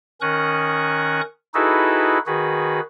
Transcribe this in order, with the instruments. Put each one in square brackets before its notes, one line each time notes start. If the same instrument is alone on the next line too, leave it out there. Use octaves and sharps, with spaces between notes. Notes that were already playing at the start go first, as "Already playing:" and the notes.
[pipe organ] D#3 C#4 A#4 C#6 D#6 F#6
D#4 E4 F#4 G#4 A4 B4
D#3 F#4 G#4 B4